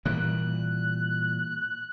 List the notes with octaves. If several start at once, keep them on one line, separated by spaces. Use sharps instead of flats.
A#2 E3 G3 F#6